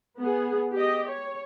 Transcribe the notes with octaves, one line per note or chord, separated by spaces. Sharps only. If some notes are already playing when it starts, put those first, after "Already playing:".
B3 G#4
G4 D#5
C#5